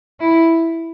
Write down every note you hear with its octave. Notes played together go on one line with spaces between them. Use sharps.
E4